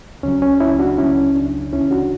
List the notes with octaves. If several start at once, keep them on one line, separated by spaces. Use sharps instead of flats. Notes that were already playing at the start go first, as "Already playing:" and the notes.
C#2 C#3 F#3 C#4
C#4
C#4 E4
D4 F#4
C#2 C#3 F#3 C#4 E4
D4
D2 C#3 E3 C#4 E4
D4 F#4